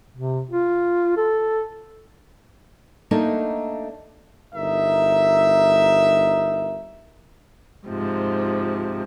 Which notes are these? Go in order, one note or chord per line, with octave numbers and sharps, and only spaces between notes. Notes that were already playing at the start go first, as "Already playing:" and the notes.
C3
F4
A4
A3 A#3 D4 D#4
G1 D#4 A#4 E5
G#2 C3 F3